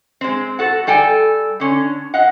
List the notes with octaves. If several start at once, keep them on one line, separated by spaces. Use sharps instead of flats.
G#3 C4
F#4 A4 F#5
G3 A4 G5 G#5
D3 C#4
D#5 F5 F#5